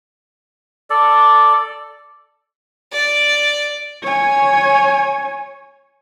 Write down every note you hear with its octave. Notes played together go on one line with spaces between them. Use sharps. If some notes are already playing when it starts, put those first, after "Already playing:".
A4 D5
D5
C#5 G#5